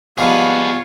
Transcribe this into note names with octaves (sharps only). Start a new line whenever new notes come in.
G#2 F3 G3 B3 F4 G#4 B4 C#5